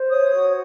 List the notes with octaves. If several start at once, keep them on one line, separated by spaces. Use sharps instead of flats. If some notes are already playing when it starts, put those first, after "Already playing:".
Already playing: C5
C#5 D#6
F#4